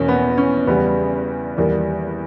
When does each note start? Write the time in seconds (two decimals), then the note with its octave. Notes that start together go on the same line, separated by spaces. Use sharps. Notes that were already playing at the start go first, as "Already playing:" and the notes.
Already playing: E2 B2 A#3 C#4
0.08 B3
0.38 C#4
0.67 E2 C#3 G3 B3
1.57 E2 D#3 G3 A#3